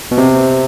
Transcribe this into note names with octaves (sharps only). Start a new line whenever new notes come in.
B2
C3